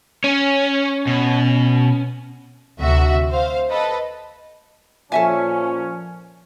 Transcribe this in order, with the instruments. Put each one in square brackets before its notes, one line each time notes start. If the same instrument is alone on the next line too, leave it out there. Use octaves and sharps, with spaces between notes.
[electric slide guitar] C#4 [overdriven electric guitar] C#5 G#5
[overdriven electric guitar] B2
[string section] D2 C3 F#4 E5
C5 F5
A4 B4 D#5
[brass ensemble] A#2 C#4 [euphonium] F3 [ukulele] A4 E5 G#5